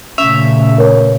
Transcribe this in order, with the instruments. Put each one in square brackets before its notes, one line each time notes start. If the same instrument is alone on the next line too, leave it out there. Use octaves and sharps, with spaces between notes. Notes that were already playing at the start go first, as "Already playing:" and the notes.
[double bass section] A#2 C#3 A3 [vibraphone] C#4 [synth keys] E5
[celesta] A#4 B4 C#5